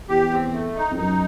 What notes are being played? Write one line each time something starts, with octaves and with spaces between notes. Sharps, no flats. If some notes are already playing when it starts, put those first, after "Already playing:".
E2 G4
C4
A3
D#4
F2
F#2 D#4